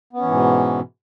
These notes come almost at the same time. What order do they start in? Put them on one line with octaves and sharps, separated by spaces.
B3 C#4 E3 G#2 B2